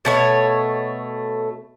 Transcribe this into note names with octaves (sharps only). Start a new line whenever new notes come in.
B2 A3 C#5